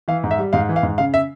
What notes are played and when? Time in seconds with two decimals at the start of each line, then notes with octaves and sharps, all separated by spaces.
0.08 E3 F5
0.24 G#2
0.31 E5
0.38 G3
0.53 G#2 F5
0.69 E3
0.76 F5
0.83 G#2
0.98 C#3 F5
1.14 E5